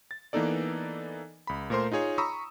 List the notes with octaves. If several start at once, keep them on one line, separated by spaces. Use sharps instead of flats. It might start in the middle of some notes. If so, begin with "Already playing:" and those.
A6
E3 A#3 B3 D#4 A4 D5
C#2 B5
A#2 A3 A#4 C5 C6
D#4 F4 G#4 C#5
A#5 B5 C#6 D#6 E6